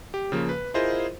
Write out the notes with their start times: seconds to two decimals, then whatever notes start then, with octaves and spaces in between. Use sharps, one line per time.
0.14 G4
0.32 C#3 F3 A#3
0.49 B4
0.74 E4 F4 G#4 A#4 C5 D#5